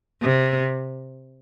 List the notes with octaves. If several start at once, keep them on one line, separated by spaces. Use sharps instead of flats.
C3